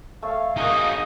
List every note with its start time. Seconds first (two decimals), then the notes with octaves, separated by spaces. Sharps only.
0.22 A3 C#5 F5
0.57 A#3 D#4 F#4 G#4 D#5